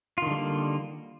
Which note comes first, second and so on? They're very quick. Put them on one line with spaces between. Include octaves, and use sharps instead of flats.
F4 D#3 D3 G3 A#3